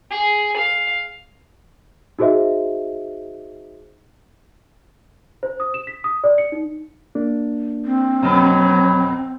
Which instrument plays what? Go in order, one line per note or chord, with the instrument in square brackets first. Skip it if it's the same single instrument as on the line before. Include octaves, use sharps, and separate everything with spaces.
[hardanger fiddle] G#4
F5
[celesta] D#4 F#4 G#4 C5 D#5 E5
C5
D#6
E7
B6
D#6
D5
C#7
D#4
[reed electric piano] A#3 D4
[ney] C4
[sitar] F2 B2 [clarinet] F#3